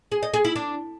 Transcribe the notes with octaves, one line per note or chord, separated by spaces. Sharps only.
G#4
D#5
G#4
E4
D4